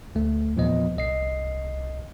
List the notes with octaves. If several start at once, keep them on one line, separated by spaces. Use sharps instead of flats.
D2 A3
E2 A#2 F3 B3 D#5
C2 D#5 C7